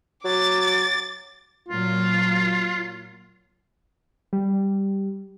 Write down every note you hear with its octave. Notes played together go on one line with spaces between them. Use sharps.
F#3 D6 A6
A#2 F#3 F4
G3